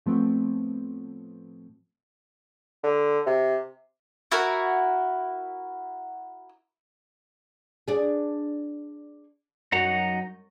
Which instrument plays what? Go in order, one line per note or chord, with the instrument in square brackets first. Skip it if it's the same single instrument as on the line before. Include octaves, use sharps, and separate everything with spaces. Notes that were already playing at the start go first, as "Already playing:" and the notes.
[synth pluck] A2 F3 A3 B3 C4
[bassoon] D3
C3
[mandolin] E4 F#4 A#4
[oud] D4 G#4
[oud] F#2 [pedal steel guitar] D#4 F#5 A#5